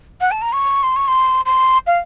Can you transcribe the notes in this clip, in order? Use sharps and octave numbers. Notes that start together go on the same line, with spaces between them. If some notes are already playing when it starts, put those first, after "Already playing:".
F#5
A5
A#5
C#6
C6
C#6
C6
C6
F5